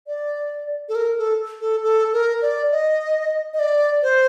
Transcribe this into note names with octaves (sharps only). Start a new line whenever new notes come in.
D5
A4
A#4
A4
A4
A4
A#4
D5
D#5
D#5
D5
C5